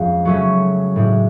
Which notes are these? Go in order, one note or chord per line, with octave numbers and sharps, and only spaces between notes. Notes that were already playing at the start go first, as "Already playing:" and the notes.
Already playing: F2 F3 G#3 B3 C#4
C#3 F#3 A3 C#4 F#4
A2 G#3 D4